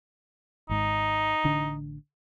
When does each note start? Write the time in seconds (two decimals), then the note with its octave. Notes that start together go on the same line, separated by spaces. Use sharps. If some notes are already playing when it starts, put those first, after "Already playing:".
0.69 G#1 G#2 D#4
1.44 A1 D3 D4